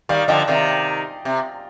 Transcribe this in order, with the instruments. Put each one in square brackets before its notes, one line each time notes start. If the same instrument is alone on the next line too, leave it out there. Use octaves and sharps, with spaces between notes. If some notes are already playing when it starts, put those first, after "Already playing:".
[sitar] D#3 G3 [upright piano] D5 F5
[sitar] D3 F3 [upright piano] D#5 G5
[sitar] C3 D#3 [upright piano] D5 F5
[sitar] C3